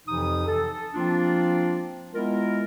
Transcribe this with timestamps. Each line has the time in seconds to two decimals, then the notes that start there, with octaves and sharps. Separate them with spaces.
0.06 F2 C3 E3 F3 D#4 D#6
0.46 A4
0.94 F3 A#3 C4 D4 F4
2.13 G#3 B3 E4 F4 A#4